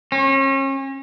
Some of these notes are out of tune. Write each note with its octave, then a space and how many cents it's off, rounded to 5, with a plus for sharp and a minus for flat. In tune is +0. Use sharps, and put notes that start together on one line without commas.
C#4 -35